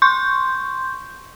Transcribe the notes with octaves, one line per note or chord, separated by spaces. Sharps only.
C6 C#6 G6